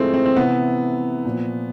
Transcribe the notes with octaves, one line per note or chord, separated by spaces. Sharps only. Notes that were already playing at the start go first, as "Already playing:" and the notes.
Already playing: A2 F3 G#3 A3 C4
C4
C4
C3 E3 B3
A#2 F3